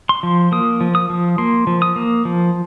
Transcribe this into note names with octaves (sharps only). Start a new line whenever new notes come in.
C6
F3
A#3 D#6
F3
D#6
F3
A#3 C6
F3
D#6
A#3
F3